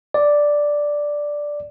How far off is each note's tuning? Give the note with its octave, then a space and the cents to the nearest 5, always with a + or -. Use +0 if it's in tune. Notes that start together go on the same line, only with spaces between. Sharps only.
D5 +0